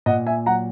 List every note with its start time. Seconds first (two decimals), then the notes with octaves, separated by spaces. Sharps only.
0.06 A#2 D#5 F#5
0.27 E5 G#5
0.46 F#3 F#5 A#5